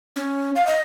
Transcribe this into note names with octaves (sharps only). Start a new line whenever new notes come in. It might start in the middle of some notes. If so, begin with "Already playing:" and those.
C#4
F5
D#5